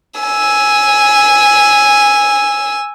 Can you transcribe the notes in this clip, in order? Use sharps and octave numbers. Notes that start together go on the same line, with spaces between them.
G#5 E6